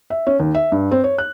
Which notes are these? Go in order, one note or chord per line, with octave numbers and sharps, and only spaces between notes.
E5
C#4
D#2
E5
G2
C4
C#5
F#6